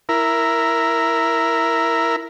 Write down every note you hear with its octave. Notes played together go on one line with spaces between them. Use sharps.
E4 A#4